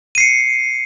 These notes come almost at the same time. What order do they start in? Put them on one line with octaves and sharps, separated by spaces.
D#7 C7 C#7